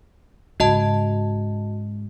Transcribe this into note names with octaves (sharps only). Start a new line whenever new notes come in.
G#2 C#3 F#4 D#5 A5